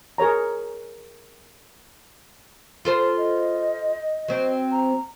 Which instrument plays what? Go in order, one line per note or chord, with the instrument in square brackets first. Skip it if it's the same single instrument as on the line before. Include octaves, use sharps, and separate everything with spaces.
[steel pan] G#4 A#4 C#5 A#5
[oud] F4 A4 C5
[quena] D#5
[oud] F#3 C4
[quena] A#5